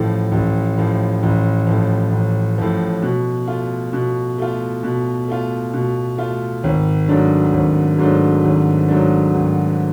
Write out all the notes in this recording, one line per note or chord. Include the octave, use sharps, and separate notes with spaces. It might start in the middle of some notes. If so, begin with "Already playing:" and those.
Already playing: A1 A2 F3
A1
A2 F3
A1
A2 F3
A1
A2 F3
B2
A3 F4
B2
A3 F4
B2
A3 F4
B2
A3 F4
G#1
G#2 F#3 A3 D4
G#1
G#2 F#3 A3 D4
G#1
G#2 F#3 A3 D4
G#1